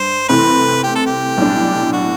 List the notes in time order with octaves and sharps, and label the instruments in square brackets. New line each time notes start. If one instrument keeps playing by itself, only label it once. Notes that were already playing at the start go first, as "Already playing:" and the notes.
Already playing: [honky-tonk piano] G2 [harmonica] C5
[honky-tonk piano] C3 E3 A3 C4 [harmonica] B4
[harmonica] G4
A4
G4
[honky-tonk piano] B1 A2 G3 D4
[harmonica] F#4